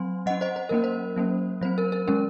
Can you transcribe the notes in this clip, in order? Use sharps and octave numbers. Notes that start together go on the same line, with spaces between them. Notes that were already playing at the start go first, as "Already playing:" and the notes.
Already playing: F#3 C4 G#5 C6
F#3 C#4 D#5 F#5
C5 D#5
C5
F#3 A#3 C#4 A#4
C5
F#3 A#3 C#4
F#3 C4 C5
A#4
A#4
D#3 G#3 C#4 A#4